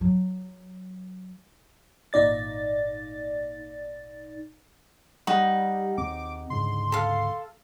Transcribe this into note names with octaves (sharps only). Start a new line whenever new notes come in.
F#3
G#1 A#2 D#4 D5 A6
G3 D#4 F#5 C#6
D#2 C4 D6
D2 G#2 C#3 C6
A4 F5